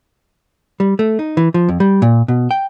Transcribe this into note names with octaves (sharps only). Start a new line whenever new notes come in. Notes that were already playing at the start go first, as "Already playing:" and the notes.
G3
A3
D#4
E3
F3
F2
G3
A#2
B2
G5